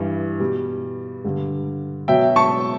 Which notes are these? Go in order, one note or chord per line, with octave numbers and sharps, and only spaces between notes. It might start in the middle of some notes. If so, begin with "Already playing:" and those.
Already playing: G2 E3 G3
B2 G3
G2 D3 G3
B2 F#3 E5 G5
A5 C#6